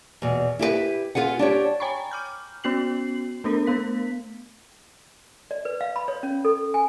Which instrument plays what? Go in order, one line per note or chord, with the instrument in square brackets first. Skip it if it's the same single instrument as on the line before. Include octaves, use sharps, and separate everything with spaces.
[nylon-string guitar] E2 B2
E4 G4 G#4 B4
F4 G#4 B4 F#5
D4 G4 C#5
[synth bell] C#5 G5 G#5 A#5 B5 C#6
D6 F6 G6
B3 C#4 F#4 C7 F#7
A3 B3 D4 A4 A#4
A3 B3 F5 B6
[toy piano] D5
B4
F5
B5
C#5
C#4
A4
G#5